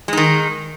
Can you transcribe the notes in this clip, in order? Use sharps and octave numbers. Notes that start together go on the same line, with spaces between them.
D#3 G#3 D#4